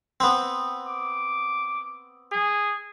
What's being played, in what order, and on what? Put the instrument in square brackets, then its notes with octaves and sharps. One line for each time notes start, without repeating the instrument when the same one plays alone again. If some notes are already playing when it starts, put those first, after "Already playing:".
[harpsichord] B3 C4
[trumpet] D6
G#4